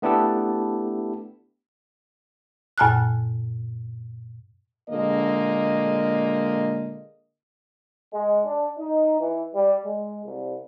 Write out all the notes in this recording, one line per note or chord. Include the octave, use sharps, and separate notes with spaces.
A3 B3 D4 E4 G4 A4
F#2 A#2 G#5 A5 F6 F#6
A#2 D3 G#3 A#3 D#5
G#3
D4
D#4
E3
G3
G#3
C2